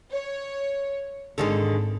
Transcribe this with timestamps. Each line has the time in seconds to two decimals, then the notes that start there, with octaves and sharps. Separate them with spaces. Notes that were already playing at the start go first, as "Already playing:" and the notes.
0.12 C#5
1.38 G#1 D3 D#3 G#3